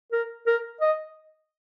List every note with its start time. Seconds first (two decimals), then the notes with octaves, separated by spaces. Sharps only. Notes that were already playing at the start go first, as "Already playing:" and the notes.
0.12 A#4
0.47 A#4
0.81 D#5